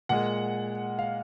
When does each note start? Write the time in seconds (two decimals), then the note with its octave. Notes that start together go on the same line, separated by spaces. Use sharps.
0.09 A#2 G#3 F#5
0.99 F5